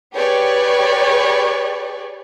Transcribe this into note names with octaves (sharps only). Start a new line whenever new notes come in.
G4 G#4 B4 C#5 D5